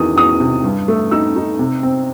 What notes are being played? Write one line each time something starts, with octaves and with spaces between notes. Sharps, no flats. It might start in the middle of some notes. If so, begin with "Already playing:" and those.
Already playing: E2 D#3 D#6
E2 D#6
C3
G2
A3
D#4 E6
D#4
C3
C4